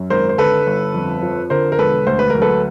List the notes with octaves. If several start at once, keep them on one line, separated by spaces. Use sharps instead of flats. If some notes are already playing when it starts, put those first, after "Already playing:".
Already playing: F#2
G#1 A#4 C5
C5
D3 A4 B4
G1
F2
F3
D3 A#4 C5
A#4
E1 A4 B4
D2 C5
B4
F#3 A#4
A4 B4